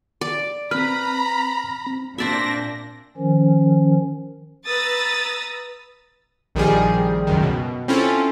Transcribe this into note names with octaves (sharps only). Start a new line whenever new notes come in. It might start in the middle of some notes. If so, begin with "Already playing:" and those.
D5
C4 B4 A#5 B5 F6
C4
A#2 D4 C5 D5 E5 A#6
D#3 F3 C#4
B4 A#5 D#6 E6 A6
A#1 D#3 F3 G3 G#4
C#2 F#2 D#3
B2
C4 C#4 E4 F4 A4